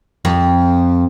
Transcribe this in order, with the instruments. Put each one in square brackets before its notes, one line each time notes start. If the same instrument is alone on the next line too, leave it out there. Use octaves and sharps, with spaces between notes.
[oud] F2